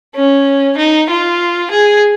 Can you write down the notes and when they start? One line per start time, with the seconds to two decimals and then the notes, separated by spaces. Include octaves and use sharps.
0.15 C#4
0.78 D#4
1.10 F4
1.71 G#4